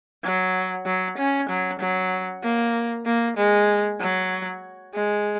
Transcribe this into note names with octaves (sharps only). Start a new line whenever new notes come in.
F#3
F#3
C#4
F#3
F#3
A#3
A#3
G#3
F#3
G#3